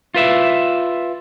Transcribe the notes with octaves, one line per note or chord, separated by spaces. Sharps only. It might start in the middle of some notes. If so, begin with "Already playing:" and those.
F4 B4 E5